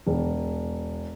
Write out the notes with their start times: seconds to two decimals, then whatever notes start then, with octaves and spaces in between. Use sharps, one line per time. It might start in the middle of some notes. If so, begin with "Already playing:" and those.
0.07 E1